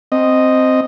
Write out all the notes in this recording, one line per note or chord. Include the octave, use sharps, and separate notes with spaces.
C4 D#5